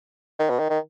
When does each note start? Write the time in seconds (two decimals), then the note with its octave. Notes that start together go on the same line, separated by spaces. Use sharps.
0.39 D#3
0.50 B2
0.59 D#3
0.69 D#3